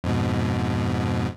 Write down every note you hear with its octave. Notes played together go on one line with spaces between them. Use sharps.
F2 G#2 B2